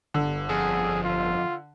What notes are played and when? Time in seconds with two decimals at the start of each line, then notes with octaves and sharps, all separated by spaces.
0.14 G1 D3
0.49 F2 G#4
1.04 F4